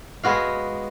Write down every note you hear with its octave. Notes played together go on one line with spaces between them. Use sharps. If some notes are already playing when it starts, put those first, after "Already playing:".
G#3 B3 F#4 F5